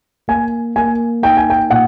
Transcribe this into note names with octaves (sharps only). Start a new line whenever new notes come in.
A#3 G#5
A#3 G#5
D#4 G5
G#5
G5
A#2 F#5